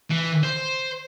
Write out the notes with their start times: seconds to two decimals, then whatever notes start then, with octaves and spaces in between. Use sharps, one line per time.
0.11 E3
0.44 C5